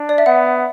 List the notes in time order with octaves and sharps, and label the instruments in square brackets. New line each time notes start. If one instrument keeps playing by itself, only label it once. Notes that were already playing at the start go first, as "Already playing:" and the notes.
Already playing: [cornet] D4
[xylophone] D5
E5
[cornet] B3 [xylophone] F#5